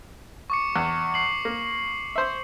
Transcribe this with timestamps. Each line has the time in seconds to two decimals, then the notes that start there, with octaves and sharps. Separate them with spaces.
0.50 C#6 D6 C#7
0.76 E2
1.14 C#6 C7 F#7
1.45 A#3
2.16 C5 E5